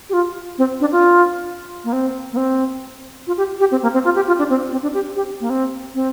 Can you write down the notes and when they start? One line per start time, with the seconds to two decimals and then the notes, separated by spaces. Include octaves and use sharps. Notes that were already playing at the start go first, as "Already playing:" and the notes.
0.09 G4
0.13 F4
0.58 C4
0.81 D4
0.92 F4
1.84 A#3
1.93 C4
2.33 A#3
2.37 C4
3.27 F4
3.37 G4
3.60 G4
3.71 C4
3.82 A#3
3.94 C4
4.05 F4
4.16 G4
4.27 F4
4.39 D4
4.49 C4
4.72 C4
4.82 D4
4.94 G4
5.16 G4
5.41 A#3
5.50 C4
5.95 C4